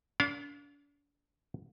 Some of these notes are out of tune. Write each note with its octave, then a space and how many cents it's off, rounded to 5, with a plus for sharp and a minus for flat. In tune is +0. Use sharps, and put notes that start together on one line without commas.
D4 -40 A#4 +0 F5 +10